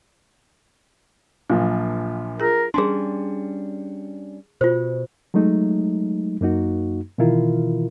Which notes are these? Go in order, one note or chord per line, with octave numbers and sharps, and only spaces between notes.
A#1 A#2 F3 F#3
F4 G#4 A#4
G3 C#4 D4 G#4 C6
B2 F4 C5
F#3 G#3 A3 D#4
F#2 A#3 D#4 F#4
B2 D#3 E3 E4 F4 A#4